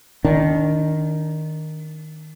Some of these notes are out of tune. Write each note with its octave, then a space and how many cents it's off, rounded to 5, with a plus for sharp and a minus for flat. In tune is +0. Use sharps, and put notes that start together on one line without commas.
D#3 +0 D4 -25